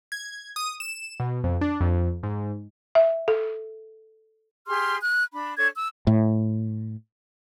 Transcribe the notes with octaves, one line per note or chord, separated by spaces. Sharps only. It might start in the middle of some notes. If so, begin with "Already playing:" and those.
G#6
D#6
E7
B2
F2
D4
F2
G#2
E5
A4
G4 G#4 C6 F6
F#6
D4 B5
D4 A4 C#5 G#6
E6
A2